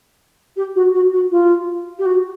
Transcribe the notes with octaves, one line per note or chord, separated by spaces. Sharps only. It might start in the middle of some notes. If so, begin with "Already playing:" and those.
G4
F#4
F#4
F#4
F4
G4
F#4